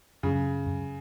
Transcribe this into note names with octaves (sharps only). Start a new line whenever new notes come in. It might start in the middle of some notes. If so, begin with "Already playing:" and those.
F#2 C#3
F#2